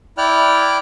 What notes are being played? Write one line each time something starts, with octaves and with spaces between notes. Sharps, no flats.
E4 D5 G5 F6 F#6